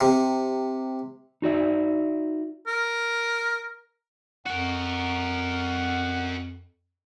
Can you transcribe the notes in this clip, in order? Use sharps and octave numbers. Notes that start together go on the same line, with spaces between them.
C3
D#4 F#4 D5 E5
A#4
F2 F#4 A#4 F#5